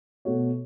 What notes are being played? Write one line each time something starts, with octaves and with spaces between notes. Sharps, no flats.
B2 A3 F#4 C#5